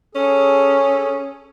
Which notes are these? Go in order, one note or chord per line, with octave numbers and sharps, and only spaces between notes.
C#4 G#4 A4